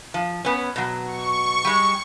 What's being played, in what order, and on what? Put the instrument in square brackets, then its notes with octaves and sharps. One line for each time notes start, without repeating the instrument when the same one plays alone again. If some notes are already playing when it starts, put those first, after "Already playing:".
[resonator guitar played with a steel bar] F3
B3 C#4
B2 F#3
[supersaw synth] C#6
[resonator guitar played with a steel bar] G3 G#3